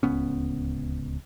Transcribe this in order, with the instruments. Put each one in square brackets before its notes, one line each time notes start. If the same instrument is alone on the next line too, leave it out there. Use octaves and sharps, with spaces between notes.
[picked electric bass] D1 C#2 B3 C#4